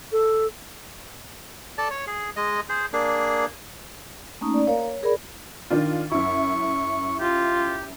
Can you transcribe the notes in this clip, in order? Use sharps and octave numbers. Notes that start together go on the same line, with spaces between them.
A4
A4 D5 A5
C#5
G#4
G#3 D#5
G#4 C5
A#3 D4 G#4
A3 A#3 C#4 D#4
D5
A#3 A#4 C#5 F5
C#5
G#4 A#4 D5 B5
D#3 D4 F4
F#2 E4 C#6
F4 G4